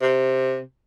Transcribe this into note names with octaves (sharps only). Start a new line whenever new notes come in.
C3